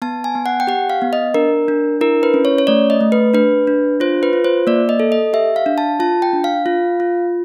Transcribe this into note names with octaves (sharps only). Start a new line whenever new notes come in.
B3 A5
G#5
B3
F#5
G5
G4 F#5
F5
B3
D#5
D4 A#4
D4
E4 A#4
B4
C#4
C#5
C#5
A3 D5
D#5
A3
B4
D4 B4
D4
F4 C5
B4
F4
C5
A#3 D5
D#5
A4
D#5
G4 E5
F5
D4
A5
F4 A5
G5
D4
F5
F4
F4